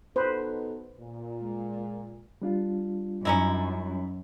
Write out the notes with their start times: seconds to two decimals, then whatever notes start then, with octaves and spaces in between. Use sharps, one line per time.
0.16 B2 D#4 A4 B4 C5
0.99 A#2
1.42 G#3
2.42 G3 D4 F4
3.25 F#2 C#4 D#4 E4